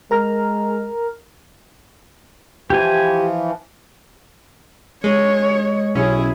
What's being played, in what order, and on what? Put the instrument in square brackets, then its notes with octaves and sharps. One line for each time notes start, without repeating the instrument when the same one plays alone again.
[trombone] G#3 [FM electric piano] A#4 A#5 F6
[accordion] E3 F3 [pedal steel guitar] G4 G#5
[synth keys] G#3 [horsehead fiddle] C#5
[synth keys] B1 C#4 [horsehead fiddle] E4 G#4